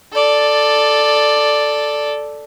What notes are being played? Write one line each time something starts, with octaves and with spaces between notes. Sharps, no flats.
A4 D5